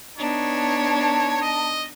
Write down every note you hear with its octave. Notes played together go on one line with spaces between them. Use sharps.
B3 D4 D#4 C#5
A5
D#5